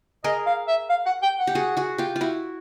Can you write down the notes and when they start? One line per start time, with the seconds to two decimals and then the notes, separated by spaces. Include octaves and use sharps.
0.24 G#4 A#4 D#5
0.46 F5
0.68 E5
0.90 F5
1.06 F#5
1.23 G5
1.39 F#5
1.47 G4
1.55 F#4 G#4
1.77 F#4 G#4
1.98 F4 G4
2.16 F4
2.21 E4 F#4